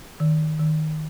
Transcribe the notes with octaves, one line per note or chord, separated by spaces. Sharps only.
D#3
D#3